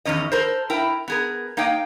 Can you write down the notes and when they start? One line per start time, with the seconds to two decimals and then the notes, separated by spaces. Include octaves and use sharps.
0.05 E2 G2 D#3 C#4 D#5
0.32 A4 A#4 C5
0.70 E4 A#4 G5
1.08 B3 G#4 A#4
1.57 A#3 D#4 D#5 F5 G5